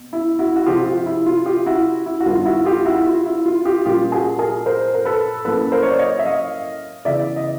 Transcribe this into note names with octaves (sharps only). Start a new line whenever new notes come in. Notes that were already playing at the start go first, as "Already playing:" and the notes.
Already playing: B2
E4
E4 F#4
F#4
C3 F3 G#3 C4 F4 G4
F4
E4
F4
F4 G4
E4 F#4
E4
F#4
G2 D#3 G3 B3 F4
E4 F#4
F4 G4
E4 F#4
F4
E4
F4
F4 G4
A#2 G3 A#3 C#4 F4 G4
F#4 G#4
G#4 A#4
A#4 C5
A#4
A4 B4
A2 F#3 A#3 C#4 A4 B4
A#4 C5
C#5
D5
C#5 D#5
E5
D#5 F5
C#3 E3 G#3 B3 D5 E5
D#5